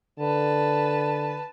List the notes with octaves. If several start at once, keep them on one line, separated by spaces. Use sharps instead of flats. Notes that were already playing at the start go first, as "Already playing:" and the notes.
D3 B4 A5